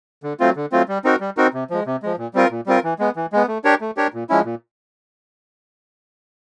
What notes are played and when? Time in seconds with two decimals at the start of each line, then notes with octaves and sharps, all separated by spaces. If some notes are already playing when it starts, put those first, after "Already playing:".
0.23 D3
0.40 F#3 A3 C4 F4
0.56 D3
0.72 F#3 A3 C4 F4
0.88 G3
1.04 C4 D#4 F#4 A#4
1.20 G3
1.37 C4 D#4 F#4 A#4
1.54 C3
1.70 F3 G#3
1.86 C3
2.03 F3 G#3
2.18 A#2
2.34 G3 C4 F4 A#4
2.51 A#2
2.66 G3 C4 F4 A#4
2.84 E3
2.99 G#3 B3
3.16 E3
3.33 G#3 B3
3.48 A3
3.64 D4 G4 A#4 C#5
3.81 A3
3.97 D4 G4 A#4 C#5
4.14 A#2
4.29 F3 G#3 C#4 E4
4.45 A#2